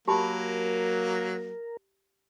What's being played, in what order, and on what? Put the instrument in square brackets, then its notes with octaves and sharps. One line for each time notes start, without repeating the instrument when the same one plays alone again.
[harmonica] F#3 A#3 [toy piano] G4 A5 B5 [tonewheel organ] A#4